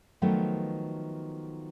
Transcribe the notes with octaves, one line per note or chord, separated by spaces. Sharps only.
D#3 F3 F#3 A3 B3